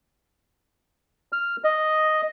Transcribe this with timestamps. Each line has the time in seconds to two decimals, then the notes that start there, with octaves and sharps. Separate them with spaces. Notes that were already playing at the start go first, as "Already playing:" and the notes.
1.32 F6
1.64 D#5